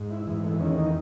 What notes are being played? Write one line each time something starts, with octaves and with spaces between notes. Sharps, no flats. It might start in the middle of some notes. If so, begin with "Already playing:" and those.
Already playing: G#2
E4
G#2 E3
A3
E2 D#3 C#4
D#4